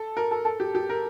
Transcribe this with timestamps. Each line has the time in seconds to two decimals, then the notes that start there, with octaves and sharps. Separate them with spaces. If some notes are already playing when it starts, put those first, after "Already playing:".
Already playing: A4
0.17 A#4
0.31 A4
0.45 A4
0.60 G4
0.75 G4
0.89 A#4